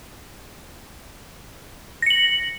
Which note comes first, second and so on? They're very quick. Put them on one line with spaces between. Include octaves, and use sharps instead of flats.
A#6 C#7 F#7